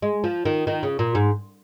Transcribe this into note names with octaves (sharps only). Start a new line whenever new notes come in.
G#3
F3
D#3
D#3
C#3
A#2
G#2